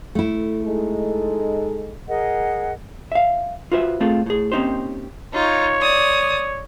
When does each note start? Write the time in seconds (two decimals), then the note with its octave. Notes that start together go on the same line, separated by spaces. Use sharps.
0.15 A3 E4
0.63 G#3 D#4 A4
2.08 G#4 A#4 D#5 F#5
3.12 E5 F5
3.72 F4 F#4 B4 C5 E5
4.00 A3 C4 F4 G#4 A4
4.26 A2 G#4
4.52 A#3 C4 C#4 D#4 G4 C5
5.33 D#4 F4 C#5
5.82 D5 D#6